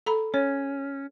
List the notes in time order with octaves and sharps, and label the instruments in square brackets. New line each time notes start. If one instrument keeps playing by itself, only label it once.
[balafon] A4 A#5 B5
[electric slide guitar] C#4 [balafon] C#5